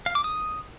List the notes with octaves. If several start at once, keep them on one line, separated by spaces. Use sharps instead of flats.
F5
D6
D#6